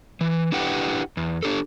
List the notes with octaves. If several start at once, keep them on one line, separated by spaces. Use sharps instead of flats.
E3
D4 E4 G4 B4 F#5 G5
E2
D4 G4 A4